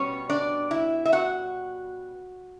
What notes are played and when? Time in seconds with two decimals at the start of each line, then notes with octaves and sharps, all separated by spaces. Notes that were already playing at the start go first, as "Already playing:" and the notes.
Already playing: B2 G3 B3 C#4 C#5
0.30 D4 D5
0.71 E4 E5
1.06 E5
1.12 F#4 F#5